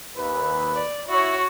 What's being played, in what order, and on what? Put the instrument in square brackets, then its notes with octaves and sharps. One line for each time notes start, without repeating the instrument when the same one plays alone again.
[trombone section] D#2 B4
[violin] D5
[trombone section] E4 [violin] F#4 C#5